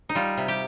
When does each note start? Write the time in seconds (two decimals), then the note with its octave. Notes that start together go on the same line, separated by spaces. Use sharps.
0.09 D#4
0.15 G3 F4
0.37 C3
0.48 G4